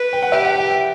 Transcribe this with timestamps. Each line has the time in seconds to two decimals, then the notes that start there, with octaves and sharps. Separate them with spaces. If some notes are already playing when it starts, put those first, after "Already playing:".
Already playing: B4
0.13 G5
0.23 F#5
0.32 G4 E5
0.45 F#5
0.59 G5
0.71 G5